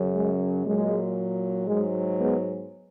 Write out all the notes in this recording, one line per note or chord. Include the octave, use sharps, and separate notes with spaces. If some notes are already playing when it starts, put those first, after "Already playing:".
Already playing: F#2 C#3 F#3
G#3
A#2 F#3 G#3
G#2 F#3 G#3
G#3 B3